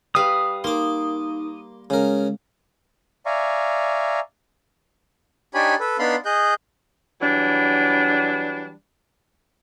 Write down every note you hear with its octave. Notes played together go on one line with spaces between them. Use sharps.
G3 B4 F5 D#6
A#3 D#4 C6 D6
C#3 G#3 A#4
D5 E5 F5 G#5 A#5 C#6
D4 D#4 G4 C#5 G#5 B5
A4 B4
B3 D4 D#4 F5 B5 C6
G#4 D#5 F#6 G6
E3 F#3 G3 D4